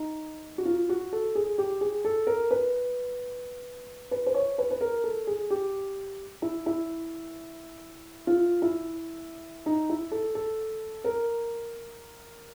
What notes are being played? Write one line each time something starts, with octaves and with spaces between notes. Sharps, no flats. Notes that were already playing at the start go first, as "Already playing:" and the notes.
Already playing: D#4
F#4
F4
F#4
A4
G#4
G4
G#4
A4
A#4
B4
B4
C5
C#5
B4
B4
A#4
A4
G#4
G4
E4
E4
F4
E4
D#4
E4
A4
A4
A#4